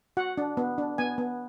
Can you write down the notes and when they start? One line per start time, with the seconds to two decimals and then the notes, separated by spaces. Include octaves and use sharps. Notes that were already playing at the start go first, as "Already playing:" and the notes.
0.17 F#4 F#5
0.38 D4
0.57 B3
0.78 D4
0.98 B3 G#5
1.18 B3